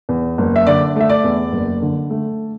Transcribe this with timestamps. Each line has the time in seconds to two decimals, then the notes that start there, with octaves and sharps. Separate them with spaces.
0.09 E2
0.38 F#1
0.56 E5
0.66 D3 D5
0.96 A3 E5
1.09 D5
1.24 E2
1.52 F#1
1.82 D3
2.10 A3